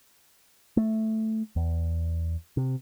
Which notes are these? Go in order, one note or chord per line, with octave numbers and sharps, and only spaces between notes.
A3
E2
C3